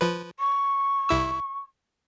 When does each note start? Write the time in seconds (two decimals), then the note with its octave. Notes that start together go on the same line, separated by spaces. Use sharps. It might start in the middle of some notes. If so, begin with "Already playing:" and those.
0.01 F3 B4
0.39 C#6
1.09 C2 E4 E6